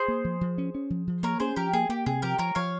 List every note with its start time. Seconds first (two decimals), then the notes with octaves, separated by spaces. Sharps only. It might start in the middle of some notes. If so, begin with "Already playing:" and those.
Already playing: G#4 C5
0.08 A#3
0.24 F3
0.41 F3
0.58 C#4
0.75 C#4
0.90 F3
1.07 F3
1.23 A#3 A#4 C#5
1.40 C#4 G#4 C5
1.56 F3 G4 A#4
1.73 A#3 G#4
1.89 A#3 G4
2.06 C3 G#4
2.22 F3 G4 A#4
2.38 F3 A#4 C#5
2.55 F3 C#5 F5